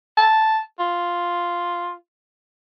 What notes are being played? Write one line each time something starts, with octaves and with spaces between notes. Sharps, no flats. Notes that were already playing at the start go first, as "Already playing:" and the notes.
A5
F4